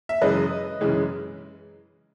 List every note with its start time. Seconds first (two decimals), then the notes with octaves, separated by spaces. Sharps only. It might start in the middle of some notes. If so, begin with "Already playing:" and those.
0.09 E5
0.21 F#2 C#3 E3 G#3 B4 D#5
0.81 F#2 C#3 E3 G#3